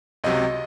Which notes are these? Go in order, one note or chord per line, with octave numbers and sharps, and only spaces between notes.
C#2 C3 F#3 D#5